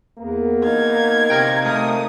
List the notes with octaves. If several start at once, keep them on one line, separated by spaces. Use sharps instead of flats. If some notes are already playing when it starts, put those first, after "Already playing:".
E2 A#3 B3 A#4
D#4 F5 G#6
C3 A#4 G5
A3 A#4 D#6